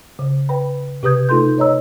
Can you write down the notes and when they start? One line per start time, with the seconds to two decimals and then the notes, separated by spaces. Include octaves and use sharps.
0.19 C#3
0.49 B4 G5 B5
1.03 C3 G4 B4 D#6 G6 G#6
1.29 A3 D#4 F4 A4 C6 G6
1.57 B4 C#5 D#5 A#5 E6